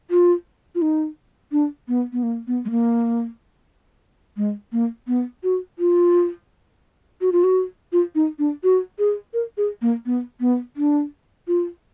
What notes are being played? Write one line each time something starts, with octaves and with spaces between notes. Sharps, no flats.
F4
F4
D#4
D4
B3
B3
A#3
B3
G#3
A#3
G#3
A#3
B3
F#4
F4
F#4
F4
F#4
F4
D#4
D4
F#4
G#4
A#4
G#4
A#3
B3
B3
D4
F4